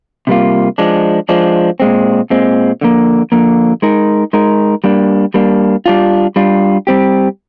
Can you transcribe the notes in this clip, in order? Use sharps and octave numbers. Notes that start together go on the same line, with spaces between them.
C3 G3 A#3 F4
F3 G#3 D4
F3 G#3 D4
A#2 G#3 C4
A#2 G#3 C4
D3 F3 A#3
D3 F3 A#3
G#3 D#4 A#4
G#3 D#4 A#4
G3 A#3 D4
G3 A#3 D4
G3 D4 F4
G3 D4 F4
G3 C4 G4